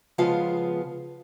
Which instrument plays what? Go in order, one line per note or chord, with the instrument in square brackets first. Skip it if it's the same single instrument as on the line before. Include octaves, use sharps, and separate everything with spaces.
[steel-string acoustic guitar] C#3 F3 G#3 B3 F4 F5